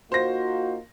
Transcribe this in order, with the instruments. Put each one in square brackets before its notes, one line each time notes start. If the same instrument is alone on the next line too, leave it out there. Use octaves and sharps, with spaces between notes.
[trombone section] A#3 D#4 F4 [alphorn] F#4 [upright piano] C5 A#6